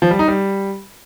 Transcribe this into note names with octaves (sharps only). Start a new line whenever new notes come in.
F3
G3
D#4
G3